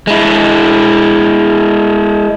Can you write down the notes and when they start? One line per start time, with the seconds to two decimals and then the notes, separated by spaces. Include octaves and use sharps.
0.07 G#3 E4